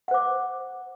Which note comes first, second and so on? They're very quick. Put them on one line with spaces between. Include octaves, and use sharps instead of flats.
F#5 C5 D6